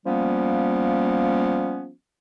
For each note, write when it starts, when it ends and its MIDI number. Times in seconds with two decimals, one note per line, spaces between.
0.06 1.89 53
0.06 1.89 55
0.06 1.89 58
0.06 1.89 59
0.06 1.89 61